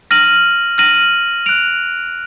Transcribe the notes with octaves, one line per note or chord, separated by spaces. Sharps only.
F6 A#6 D#7 F#7
F6 A#6 D#7 F#7
F#6 D7 F7